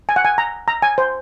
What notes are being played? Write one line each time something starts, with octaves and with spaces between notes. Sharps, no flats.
G#5
F#5
G#5
A#5
A#5
G#5
C5